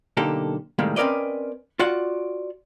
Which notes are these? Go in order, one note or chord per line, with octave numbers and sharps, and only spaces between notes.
B1 D3 A#3 D#4 G4 A4
A2 C3 D#3 G3 G#3 A#3
C4 C#4 A#4 B4 D5 D#5
F4 F#4 D5 F#5